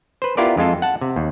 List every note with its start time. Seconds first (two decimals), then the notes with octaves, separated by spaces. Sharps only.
0.22 B4 C5
0.37 B3 E4 F4 G4 A#4 D5
0.57 F2 G#3 F4 A4
0.82 F#5 A5
1.01 C3
1.16 D#2